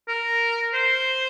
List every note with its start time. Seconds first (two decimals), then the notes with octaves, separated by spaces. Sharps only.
0.08 A#4
0.74 C5